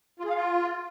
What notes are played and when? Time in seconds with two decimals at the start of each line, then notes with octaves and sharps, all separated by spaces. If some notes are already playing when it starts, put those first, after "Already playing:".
0.20 F4
0.25 G#4
0.30 F5
0.35 F4